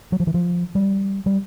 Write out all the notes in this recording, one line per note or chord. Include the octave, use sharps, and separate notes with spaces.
F#3
F3
E3
F3
G3
G3